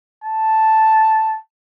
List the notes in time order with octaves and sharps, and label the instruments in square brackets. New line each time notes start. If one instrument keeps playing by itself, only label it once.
[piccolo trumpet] A5